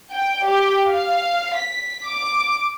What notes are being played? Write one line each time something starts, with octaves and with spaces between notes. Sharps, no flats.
G5
G4
F5
B6
D6